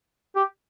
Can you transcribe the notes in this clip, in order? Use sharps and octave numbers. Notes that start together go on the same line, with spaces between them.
G4